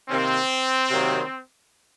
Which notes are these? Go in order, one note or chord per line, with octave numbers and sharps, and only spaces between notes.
C3 D#3 A#3 C4
C3 D#3 F#3 A#3